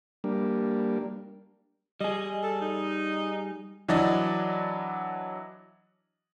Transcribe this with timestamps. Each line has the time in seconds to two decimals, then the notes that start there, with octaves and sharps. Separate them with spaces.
0.24 G3 A#3 D4
2.01 G3 G#4 D#5
2.43 A4
2.61 D#4
3.88 E3 F#3 D4 D5 D#5